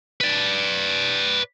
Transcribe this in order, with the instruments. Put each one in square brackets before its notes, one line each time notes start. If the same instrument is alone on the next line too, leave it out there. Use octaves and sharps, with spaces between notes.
[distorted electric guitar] B4 D5